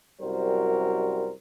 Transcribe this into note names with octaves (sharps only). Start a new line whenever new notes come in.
C2 F#2 G3 F#4 A#4 C5